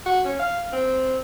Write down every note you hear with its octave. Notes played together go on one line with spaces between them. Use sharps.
F#4
C#4
F5
C4